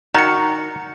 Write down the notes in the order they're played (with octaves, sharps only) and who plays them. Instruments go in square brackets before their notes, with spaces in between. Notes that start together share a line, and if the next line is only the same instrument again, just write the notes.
[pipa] D#3 [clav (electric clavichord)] F#4 [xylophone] A#5 C#7